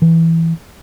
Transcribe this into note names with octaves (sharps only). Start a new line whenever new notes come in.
E3